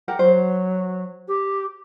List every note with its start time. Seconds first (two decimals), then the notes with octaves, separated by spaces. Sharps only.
0.08 G4 A#4 F#5
0.19 F#3 C5
1.28 G4